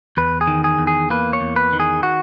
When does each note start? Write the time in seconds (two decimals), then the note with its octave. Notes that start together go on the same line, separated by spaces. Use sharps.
0.17 E2 B4
0.41 G#4
0.48 D#3
0.64 G#4
0.79 E2
0.87 G#4
1.10 A#3 B4
1.33 C#5
1.41 E2
1.56 B4
1.73 D#3
1.80 G#4
2.03 F#4